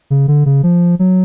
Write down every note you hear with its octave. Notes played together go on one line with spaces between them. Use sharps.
C#3
D3
C#3
F3
F#3